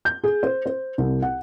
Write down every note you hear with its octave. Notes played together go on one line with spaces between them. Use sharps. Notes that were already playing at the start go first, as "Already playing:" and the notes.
G6
G#4
C5
C5
C2
F#5